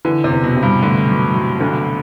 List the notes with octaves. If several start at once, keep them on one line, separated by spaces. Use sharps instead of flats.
D3 E3
C3
E2
B2
C3
G2
D3 A3
F#3
F#3
D2